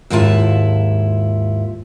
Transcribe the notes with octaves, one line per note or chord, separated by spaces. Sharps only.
D#2 G#2 E4 F4 A5